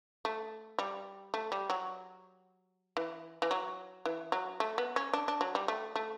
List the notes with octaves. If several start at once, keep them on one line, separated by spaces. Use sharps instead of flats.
A3
G3
A3
G3
F#3
E3
E3
F#3
E3
F#3
A3
B3
C#4
D4
D4
F#3
G3
A3
A3